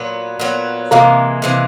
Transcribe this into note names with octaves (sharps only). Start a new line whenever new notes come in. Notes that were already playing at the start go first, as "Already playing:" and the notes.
Already playing: A#2 F#3 B3
A#2 F#3 B3
C3 E3 G#3 A#3
C3 E3 G#3